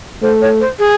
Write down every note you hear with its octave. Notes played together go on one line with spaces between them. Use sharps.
A3 C5
C#5
C5
G#4